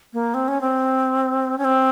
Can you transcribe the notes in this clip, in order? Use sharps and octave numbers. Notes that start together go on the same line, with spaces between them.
A#3
C4
C#4
C4
C#4
C4